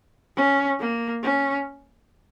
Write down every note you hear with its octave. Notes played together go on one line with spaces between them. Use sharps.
C#4
A#3
C#4